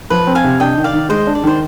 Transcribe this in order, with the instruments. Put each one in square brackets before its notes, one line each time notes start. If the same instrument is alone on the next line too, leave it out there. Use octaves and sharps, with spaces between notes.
[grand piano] F3 [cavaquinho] B4
[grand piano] C4
[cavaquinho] F5 G#5
[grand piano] C3
[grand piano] D4 [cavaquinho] D#5 G5
[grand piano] D#3
[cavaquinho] D5 F5
[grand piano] D#3
[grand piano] G#3 [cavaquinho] C5 D#5
[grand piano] D4
[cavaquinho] D5
[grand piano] D#3 [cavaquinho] C5